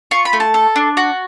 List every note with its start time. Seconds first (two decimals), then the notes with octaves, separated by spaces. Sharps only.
0.11 F4 C#6
0.25 B5
0.33 A3
0.40 A5
0.54 A4
0.76 D4
0.97 F#4